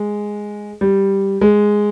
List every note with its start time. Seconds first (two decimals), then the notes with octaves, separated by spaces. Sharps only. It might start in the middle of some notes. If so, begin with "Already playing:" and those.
Already playing: G#3
0.81 G3
1.41 G#3